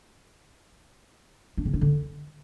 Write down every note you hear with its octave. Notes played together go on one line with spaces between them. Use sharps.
D4
C#3
D4
D3